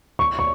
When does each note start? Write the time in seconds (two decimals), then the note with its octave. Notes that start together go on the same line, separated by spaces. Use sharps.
0.19 C#6
0.39 C#6